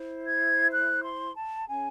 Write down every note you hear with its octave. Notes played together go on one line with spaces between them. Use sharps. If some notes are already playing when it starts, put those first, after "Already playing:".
Already playing: E4 C5
G#6
F#6
C6
A5
C#4 G#4 C#5 G#5